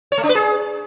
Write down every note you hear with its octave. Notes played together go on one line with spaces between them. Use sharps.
C#5
A3
D4
B4
G#4